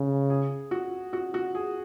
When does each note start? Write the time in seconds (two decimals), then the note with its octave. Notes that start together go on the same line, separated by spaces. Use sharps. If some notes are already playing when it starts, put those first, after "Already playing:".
Already playing: C#3
0.30 G#4
0.71 F#4
1.13 F#4
1.34 F#4
1.55 G#4